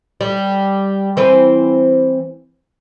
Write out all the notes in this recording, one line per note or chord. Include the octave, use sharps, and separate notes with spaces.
G3
E3 C4 B4